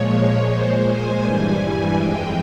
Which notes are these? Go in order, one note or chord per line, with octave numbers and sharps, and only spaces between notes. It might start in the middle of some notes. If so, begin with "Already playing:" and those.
Already playing: A#2 F3 G#3 C#5
A#2 G#3 C5
G#5
G2 E3 G3
G#5
F2 E3 G#3 G5